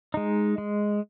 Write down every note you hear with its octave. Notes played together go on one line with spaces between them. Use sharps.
G#3 D#4
G#3